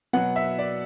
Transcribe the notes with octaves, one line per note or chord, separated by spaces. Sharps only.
B2 F#3 B3 F#5
E5
D5